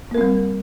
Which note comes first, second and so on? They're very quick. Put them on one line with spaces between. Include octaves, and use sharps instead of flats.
A#3 A#4 C4 G3